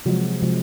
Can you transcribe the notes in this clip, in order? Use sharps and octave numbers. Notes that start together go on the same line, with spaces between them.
C3 F3 F#3 G#3 F#4
C3 F3 G#3